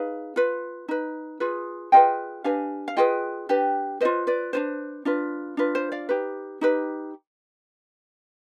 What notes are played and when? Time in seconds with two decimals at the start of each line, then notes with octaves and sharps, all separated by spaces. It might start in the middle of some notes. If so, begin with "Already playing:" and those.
Already playing: D#4 G#4 B4 F5
0.36 F4 B4
0.88 D#4 B4
1.40 F4 G#4 B4
1.92 F4 G#4 B4 D#5 G5
2.44 D4 G4 B4 F5 G#5
2.88 F5
2.97 F4 G#4 B4 D#5 G5
3.49 D4 G4 B4
4.01 F4 G#4 B4 C5 D#5
4.27 B4 D5
4.53 D4 F4 B4 C5
5.05 D4 F4 B4
5.57 D4 F4 B4
5.75 C5
5.92 D5 F5
6.09 D#4 G4 B4
6.61 D#4 G4 B4